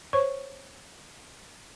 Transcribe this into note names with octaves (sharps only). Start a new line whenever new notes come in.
C5 C#5 C#6